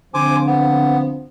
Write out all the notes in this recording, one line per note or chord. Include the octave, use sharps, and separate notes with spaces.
D3 F3 C4 C5 G#5 D6
B3